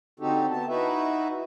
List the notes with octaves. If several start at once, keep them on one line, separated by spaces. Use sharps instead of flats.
D3 C4 D#4 F#4 G4 A4
B3 A5
D#4 E4 F#4 B4 E5